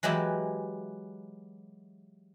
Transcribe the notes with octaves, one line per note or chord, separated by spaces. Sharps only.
E3 F#3 G#3 E4 G4 E5